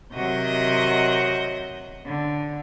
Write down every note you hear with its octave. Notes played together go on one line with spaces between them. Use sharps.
C3 D#3 F#3 F#4 D#5 G6
D3